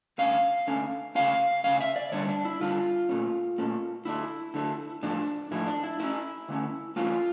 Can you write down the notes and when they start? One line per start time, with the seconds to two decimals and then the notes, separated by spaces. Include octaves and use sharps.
0.18 D3 A3 C#4 F5
0.67 D3 A3 C#4
1.15 C#3 E3 A3 C#4 F5
1.64 C#3 E3 A3 C#4 F5
1.80 E5
1.96 D5
2.12 D3 G3 D4 C#5
2.29 D4
2.45 E4
2.60 D3 G3 D4 F4
3.09 A#2 A3 C#4
3.58 A#2 A3 C#4
4.05 D3 A3 D4 E4
4.54 D3 A3 D4
5.03 A2 F3 A3 D4
5.51 A2 F3 A3 E4
5.67 D4
5.84 E4
5.99 D3 A3 C#4 E4
6.48 D3 A3 C#4
6.96 E3 A3 C#4 F4